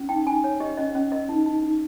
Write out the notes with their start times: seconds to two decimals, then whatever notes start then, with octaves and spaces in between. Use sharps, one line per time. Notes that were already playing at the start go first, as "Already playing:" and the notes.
Already playing: C#4
0.09 D#4 G5
0.27 D#4 G#5
0.44 C#5
0.60 G4 D#5
0.77 C#4 D#5
0.95 C#4 D#5
1.12 A#4 D#5
1.29 D#4
1.46 D#4
1.63 D#4